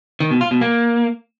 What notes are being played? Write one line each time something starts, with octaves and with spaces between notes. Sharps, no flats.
D#3
B2
F4
B2
A#3